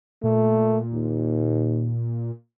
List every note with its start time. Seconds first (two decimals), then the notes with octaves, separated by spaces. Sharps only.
0.23 A#2 A3
0.94 D#2